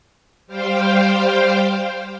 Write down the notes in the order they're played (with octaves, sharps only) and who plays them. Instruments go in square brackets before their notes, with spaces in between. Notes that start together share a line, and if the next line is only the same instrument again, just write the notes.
[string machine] G3 C5 F5 G5